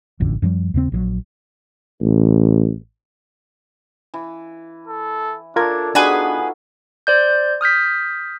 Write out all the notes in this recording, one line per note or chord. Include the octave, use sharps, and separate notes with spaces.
E1 A1 F2 D3
F#2 F3 G3
D#2 C#3 C4
A#1 C#3 F#3
A1
E3
A4
D4 F4 A4 A#4 C#5 D5 G#6
B3 D4 D#4 F4 F#4 G#4 B4 G#5
C5 D5 G6
D#6 F6 G6 B6